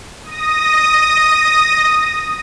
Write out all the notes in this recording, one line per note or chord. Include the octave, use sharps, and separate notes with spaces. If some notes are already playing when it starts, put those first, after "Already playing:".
D#6 A#6